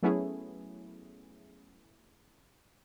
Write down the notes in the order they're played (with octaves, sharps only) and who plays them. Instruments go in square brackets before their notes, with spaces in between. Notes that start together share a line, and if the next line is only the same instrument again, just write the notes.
[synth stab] F#3 A3 B3 C#4 E4 G#4